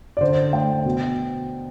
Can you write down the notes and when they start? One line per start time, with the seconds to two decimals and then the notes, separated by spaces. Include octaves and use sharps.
0.17 D5
0.21 D3 C5
0.53 A3 G5
0.85 B2